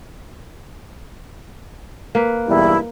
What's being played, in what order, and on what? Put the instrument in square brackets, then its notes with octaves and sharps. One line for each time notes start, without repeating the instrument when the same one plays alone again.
[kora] A#3 B4
[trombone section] B1 E2 G2 [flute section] E4